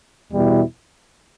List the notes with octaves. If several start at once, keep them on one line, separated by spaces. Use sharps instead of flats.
E2 B2 G3 E4